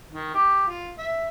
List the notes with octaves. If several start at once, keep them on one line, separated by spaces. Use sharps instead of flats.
D#3
G4
F4
E5